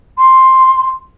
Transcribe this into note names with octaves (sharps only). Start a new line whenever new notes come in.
C6